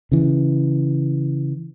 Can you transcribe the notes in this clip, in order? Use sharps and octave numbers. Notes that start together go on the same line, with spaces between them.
C#3 E3